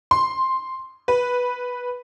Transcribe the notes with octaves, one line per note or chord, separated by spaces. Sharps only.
C6
B4